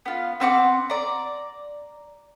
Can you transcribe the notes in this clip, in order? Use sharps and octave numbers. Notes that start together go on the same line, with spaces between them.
B3 F4
B3 C4 F#5 D6
D5 A#5